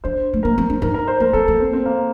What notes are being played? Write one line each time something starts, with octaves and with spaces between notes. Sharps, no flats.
D4 C5
A3
A#3 A#4
C4
D4
D#4 A#4
A#4
C5
A#3 A#4
C4 A4
A#3
C4
C4
A#3